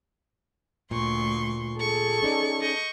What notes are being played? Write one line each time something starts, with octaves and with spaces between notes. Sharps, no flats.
D2 A#2 C6 C#6
G#4 A4 C#6
C#4 D#4 D5
D#5 C#6 G6